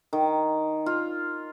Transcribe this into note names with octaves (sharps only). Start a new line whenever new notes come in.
D#3
F4